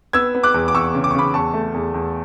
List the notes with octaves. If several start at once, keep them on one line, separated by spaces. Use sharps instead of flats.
B3 E6 G#6
B3
D6 F#6
E2
D6
E2 C#6 E6
C#3
D6
C#6
C#3 B5 D6
E2 A5 C#6
A3
E2
E2